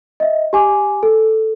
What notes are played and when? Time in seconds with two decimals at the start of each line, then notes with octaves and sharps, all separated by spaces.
0.20 D#5 E5
0.53 G4 G#5 D6
1.03 A4